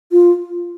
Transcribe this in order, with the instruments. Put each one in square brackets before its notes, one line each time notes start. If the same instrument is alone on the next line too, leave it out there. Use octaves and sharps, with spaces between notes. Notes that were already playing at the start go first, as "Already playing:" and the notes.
[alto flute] F4